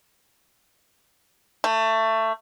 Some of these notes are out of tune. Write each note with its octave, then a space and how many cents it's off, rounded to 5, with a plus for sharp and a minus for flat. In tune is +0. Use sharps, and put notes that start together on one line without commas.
A3 +20